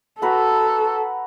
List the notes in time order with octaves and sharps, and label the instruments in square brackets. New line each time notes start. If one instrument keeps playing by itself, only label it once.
[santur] F#4 B4 A#5 [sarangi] A4